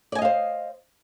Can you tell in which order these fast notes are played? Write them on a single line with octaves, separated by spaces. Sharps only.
D5 G#5 D#5 F5 C5